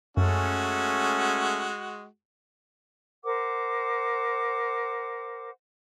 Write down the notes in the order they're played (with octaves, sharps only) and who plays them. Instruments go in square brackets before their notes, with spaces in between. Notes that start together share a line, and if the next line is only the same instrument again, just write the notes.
[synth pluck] F#2 [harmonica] G#3 F#4 [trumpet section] A3 C#4
[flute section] A#4 C5 F#5 D6